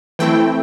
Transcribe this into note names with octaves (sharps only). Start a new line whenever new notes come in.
E3 A3 C4 E4 G5